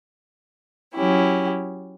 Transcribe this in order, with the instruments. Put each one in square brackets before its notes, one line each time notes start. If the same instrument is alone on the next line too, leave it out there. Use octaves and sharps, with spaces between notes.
[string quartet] F#3 C#4 E4 G4